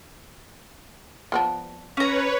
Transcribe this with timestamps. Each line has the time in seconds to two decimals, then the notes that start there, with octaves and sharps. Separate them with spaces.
1.32 F3 B3 D4
1.97 C#4 B4 C#5 A#5